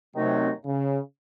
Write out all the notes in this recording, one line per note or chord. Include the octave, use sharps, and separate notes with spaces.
F#2 C3 D#3 F#3 A3 D#4
C#3